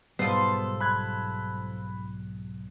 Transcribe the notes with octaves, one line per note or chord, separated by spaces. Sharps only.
B1 G#2 G3 B3 F4 A4 C5
B5 F#6 G#6